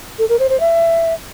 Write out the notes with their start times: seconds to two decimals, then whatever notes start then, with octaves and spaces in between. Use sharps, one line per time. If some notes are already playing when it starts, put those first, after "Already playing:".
0.19 A4
0.29 A#4
0.39 C5
0.50 C5
0.60 E5